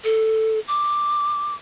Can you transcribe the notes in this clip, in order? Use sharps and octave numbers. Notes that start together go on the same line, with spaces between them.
A4
D6